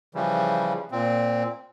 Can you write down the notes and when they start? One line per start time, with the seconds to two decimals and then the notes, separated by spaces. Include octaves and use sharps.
0.15 C#3 E3 F3 G3
0.91 A#2 C4